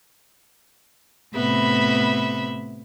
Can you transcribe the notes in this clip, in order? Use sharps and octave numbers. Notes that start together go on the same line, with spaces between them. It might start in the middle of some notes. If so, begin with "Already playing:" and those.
A2 C3 B3 E5 B5